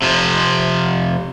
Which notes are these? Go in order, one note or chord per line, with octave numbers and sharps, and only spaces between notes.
C3 F3